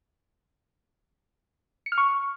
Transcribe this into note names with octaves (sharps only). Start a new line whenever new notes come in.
C#7
F6
C#6